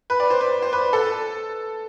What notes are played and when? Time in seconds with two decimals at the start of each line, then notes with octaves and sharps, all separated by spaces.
0.10 B4
0.20 D5
0.30 C5
0.41 B4
0.62 C5
0.73 B4
0.93 A4